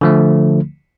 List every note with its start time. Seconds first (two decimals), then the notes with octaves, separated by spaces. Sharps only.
0.01 D3 F3 A3